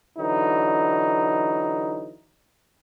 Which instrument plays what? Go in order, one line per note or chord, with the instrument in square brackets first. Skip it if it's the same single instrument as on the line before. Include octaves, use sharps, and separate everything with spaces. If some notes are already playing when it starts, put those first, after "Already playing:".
[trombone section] D3 E3 F#3 D#4